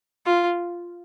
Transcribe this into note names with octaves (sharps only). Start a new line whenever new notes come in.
F4